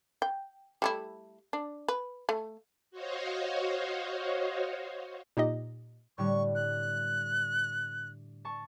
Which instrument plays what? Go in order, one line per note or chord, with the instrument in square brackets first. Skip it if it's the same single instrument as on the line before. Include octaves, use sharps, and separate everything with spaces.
[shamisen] G5
G3 A3 E4
D4
B4
A3
[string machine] F#4 C5 C#5 D#5 F5
[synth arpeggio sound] A#2 D#4 G4 D#5
[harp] A2 D3 G3 [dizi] C#6
[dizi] F#6
[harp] A5 C#6